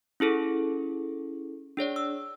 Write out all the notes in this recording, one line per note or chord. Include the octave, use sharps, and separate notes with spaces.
C#4 E4 G#4 A4
D4 G#4 C#5 D5
E6